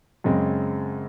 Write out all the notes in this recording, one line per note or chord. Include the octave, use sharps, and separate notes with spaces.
F#2 C#3 G#3 C4